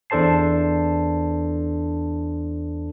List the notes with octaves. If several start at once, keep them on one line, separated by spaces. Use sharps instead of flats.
E2 D4 A4 C5 A5 C7